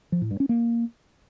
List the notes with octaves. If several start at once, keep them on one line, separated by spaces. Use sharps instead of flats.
F3
A2
G2
C#4
A#3